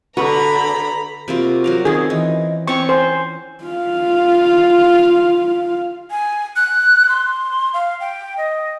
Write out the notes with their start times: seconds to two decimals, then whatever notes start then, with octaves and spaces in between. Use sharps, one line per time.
0.17 D3 F#4 B4 A#5 B5
1.28 C3 A#3 F4 F#4
1.64 F#3 A#4 F5
1.85 D#3 C4 C#4 G#4
2.10 E3 D#5
2.68 C4 C#4 C#5 G5 C#6
2.89 C5 G#5
3.64 F4 F5
6.11 G#5
6.56 F#6
7.09 C6
7.74 F5
8.00 G5
8.38 D#5